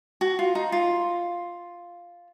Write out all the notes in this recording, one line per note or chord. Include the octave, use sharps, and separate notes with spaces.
F#4
F4
D#4
F4